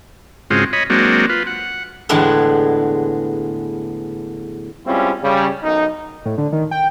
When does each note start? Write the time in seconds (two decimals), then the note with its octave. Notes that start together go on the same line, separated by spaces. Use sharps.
0.50 G#2 C#3 G#3 C4 F4 F#4
0.73 C#5 D#5 B5
0.90 F#3 G#3 A#3 C4 D4 F#4
1.30 F4 B4
1.47 F#5
2.09 E2 A2 D3 G#3 B3 E4
4.86 G3 G#3 C4 C#4 E4 F4
5.22 C#3 G3
5.63 B1 F#2 D#4
6.25 A2
6.38 D3
6.52 D#3
6.71 G5